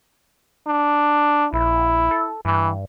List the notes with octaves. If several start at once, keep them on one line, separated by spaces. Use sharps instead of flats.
D4
A#1 E4
A4
G2 E3